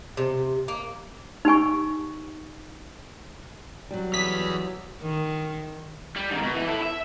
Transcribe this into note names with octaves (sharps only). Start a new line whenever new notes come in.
C3
A#3
D#4 G4 G#5 C#6
F#3 G3
E3 G#4 B6
D#3
G3
G#2 D#3
B2
E3
E4 A4
E5